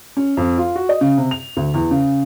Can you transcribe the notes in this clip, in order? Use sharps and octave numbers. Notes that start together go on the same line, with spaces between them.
C#4
F2
F4
F#4
D#5
C#3
C3
F7
D2
E2
C#3